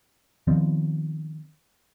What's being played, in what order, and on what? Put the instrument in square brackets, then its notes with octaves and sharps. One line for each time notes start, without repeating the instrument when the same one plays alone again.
[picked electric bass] D#3 F3 B3 C4